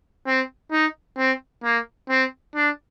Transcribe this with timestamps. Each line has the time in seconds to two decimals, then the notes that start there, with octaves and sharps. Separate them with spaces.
0.27 C4
0.72 D#4
1.18 C4
1.64 A#3
2.10 C4
2.55 D4